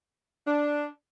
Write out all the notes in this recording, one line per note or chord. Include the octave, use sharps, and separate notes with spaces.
D4